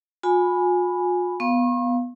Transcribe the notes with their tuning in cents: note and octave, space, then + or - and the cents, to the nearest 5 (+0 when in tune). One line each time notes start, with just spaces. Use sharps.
F4 +45 G#5 +0 B5 +0
B3 +0 F5 +0 C#6 -45